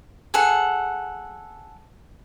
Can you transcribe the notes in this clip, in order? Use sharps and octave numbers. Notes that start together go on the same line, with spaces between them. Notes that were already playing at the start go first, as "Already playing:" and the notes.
G#4 A4 F#5